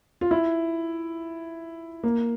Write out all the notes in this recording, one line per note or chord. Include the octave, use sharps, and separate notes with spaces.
F4
E4
A#3